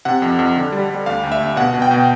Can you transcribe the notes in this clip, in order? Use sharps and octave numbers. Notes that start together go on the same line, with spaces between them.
C3 F#5
F2
F2
D3
G3
G3
D2 F5
D2
E5
D2
B2 F#5
B2
G5
B2